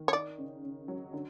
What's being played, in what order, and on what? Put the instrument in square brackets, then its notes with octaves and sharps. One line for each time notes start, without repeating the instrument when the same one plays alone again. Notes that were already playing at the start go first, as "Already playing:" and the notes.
Already playing: [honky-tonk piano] D#3
[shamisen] C#5
[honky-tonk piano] D#4 [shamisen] D5
[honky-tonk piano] C#3
C#3
F#3
D3